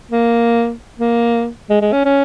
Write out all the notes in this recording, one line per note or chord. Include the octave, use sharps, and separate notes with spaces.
A#3
A#3
G#3
G#3
C#4
C#4